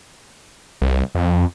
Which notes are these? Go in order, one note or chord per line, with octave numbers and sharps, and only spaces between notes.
C2
F2